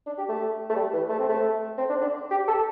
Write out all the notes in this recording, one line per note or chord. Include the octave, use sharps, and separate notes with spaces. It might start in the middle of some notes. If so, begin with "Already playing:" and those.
D4
G4
A3
A3
G3
E3
A3
C4
A3
C4
D4
D4
G4
A4